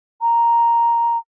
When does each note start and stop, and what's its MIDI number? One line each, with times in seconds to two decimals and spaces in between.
0.21 1.17 82